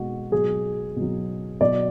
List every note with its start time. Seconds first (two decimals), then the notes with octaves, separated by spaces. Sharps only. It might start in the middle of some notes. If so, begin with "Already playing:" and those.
Already playing: B2 G#3 F#4
0.32 B2 F#3 G#4
0.96 B2 F#3
1.61 B2 F#3 D5